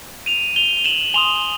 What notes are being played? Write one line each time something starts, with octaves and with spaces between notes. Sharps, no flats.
D#7 F7
F7 G7
F7
E7 F#7
G#5 C6 D#6 F7 G7